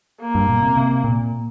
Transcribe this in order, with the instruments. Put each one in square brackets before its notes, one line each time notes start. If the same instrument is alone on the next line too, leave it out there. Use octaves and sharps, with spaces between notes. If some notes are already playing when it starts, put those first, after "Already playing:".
[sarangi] A#3
[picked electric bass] G2
A#2
C3
C3
A#2